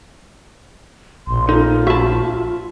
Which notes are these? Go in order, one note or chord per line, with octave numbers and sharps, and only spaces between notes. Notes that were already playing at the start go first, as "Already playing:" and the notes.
A#1 C6
D#4 F4 A4
F#4 E5 A5 B5